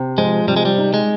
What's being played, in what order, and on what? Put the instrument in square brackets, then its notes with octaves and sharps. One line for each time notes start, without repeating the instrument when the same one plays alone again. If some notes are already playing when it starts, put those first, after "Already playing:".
Already playing: [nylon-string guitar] C3
[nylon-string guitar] F3 [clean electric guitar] G#3
[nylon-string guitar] C3 [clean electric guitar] G3
[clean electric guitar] G#3
G3
[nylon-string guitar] D#4
[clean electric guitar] G#3